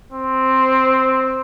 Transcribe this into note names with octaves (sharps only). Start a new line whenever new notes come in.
C4